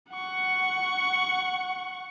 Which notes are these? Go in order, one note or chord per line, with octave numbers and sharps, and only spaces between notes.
F#5 C#6